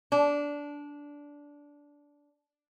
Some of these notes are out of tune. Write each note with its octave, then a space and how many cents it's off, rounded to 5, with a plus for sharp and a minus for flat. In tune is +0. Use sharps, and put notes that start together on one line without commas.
D4 -15